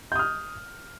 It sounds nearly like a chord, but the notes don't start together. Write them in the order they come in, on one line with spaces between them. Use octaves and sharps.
G6 D#6 F6